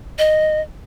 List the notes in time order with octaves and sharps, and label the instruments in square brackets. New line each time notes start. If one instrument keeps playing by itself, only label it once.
[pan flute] D#5